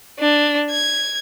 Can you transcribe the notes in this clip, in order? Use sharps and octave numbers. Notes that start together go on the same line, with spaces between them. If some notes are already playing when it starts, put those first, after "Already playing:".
D4
G#6